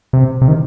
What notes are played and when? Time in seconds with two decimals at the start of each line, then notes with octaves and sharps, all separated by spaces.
0.13 C3
0.42 C3
0.48 D#3